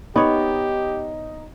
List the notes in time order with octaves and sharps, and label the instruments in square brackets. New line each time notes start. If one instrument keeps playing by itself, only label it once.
[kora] B3 C#5 [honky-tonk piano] D#4 [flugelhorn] G4